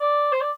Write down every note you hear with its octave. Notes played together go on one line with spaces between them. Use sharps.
D5
C5
D5